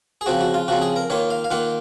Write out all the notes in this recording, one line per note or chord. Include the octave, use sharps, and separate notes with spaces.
G#4
C#3 F3 C4 F#4
F#4
F4
C#3 F3 C4 F#4
G#4
A#4
D#3 A#3 F4 C#5
F5
F5
D#3 A#3 F4 F#5